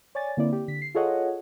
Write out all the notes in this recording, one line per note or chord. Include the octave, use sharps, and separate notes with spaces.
C#5 D5 G#5 A6
D3 A#3 C4 E4 D5
G4
D3 B6
C7
F4 G#4 A4 C#5 D#5 F#5